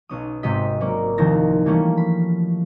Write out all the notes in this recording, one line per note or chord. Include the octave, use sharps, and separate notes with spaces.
B1 C#4 D#6
G#1 G#2 C3 G4 D#5 B6
F#3 A#3 C#4 D5
C2 D#3 F3 A#6
E3 F3 G3 A3 A#3 C#4
B5